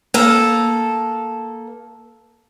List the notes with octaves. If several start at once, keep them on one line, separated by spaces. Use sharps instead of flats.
A#3 A4